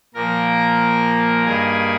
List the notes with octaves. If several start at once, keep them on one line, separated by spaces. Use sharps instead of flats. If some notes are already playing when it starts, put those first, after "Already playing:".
A#2 F3 A#3 A#4 A#5
G2 D#3 G3 A#3 G#4 G#5